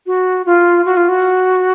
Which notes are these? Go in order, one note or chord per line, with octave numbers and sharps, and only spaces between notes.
F#4
F4
F#4
F4
F#4